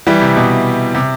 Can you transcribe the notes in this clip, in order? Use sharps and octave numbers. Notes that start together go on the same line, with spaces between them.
E3 G3
C3
B2
C3